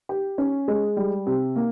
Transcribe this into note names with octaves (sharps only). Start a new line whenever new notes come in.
G4
C#4
G#3
G3
C3
A#3